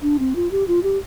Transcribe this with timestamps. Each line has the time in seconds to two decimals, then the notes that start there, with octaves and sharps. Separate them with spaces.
0.02 D4
0.19 C4
0.36 F4
0.52 G4
0.68 F4
0.83 G4